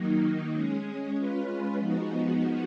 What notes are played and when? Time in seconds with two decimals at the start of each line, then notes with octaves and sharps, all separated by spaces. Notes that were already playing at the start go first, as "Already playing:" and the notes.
Already playing: D#3 F#3 A#3 D#4
0.55 G#3 C#4 G#4
1.17 G#3 C#4 F4 B4
1.79 F3 G#3 B3 D#4 F#4